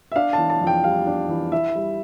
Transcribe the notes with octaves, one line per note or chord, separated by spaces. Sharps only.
E5
D4 F5
E3 A5
A5
F2
G5
G3 F5
D4
E3
E4 E5
G3